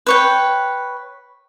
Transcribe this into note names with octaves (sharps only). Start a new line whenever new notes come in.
B4 C#5 G5